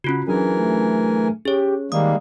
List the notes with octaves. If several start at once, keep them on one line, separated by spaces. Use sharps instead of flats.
C#3 C#4 F4 F#4 B5
E3 F#3 D4 G#4 A#4 G#5
A3
C#4 G4 G#4 C#5
D#3 G3 G#3 A#3 D#6